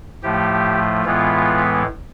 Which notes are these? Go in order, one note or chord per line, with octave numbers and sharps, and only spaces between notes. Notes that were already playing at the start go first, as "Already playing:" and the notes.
A2 F3 A3 G4
A2 E3 G#3 B3 F4